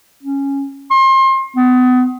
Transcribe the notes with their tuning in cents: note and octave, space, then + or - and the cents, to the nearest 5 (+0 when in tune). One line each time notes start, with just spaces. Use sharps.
C#4 -5
C6 +30
B3 +30